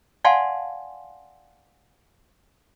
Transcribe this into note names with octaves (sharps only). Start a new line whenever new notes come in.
D5 F5 F#5 G#5 A5 C6